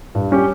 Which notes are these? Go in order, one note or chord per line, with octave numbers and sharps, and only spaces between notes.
G2
G3 C#4 G4 C#5